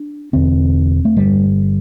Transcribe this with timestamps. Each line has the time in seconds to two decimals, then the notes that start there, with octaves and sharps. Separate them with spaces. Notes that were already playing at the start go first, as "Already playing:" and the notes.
Already playing: D4
0.33 E1 E2 D3 C4
1.05 A3
1.16 G1 G2 D3 G3